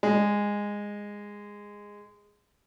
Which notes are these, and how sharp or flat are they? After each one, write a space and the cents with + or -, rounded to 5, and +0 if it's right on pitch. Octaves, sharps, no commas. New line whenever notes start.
G#3 -15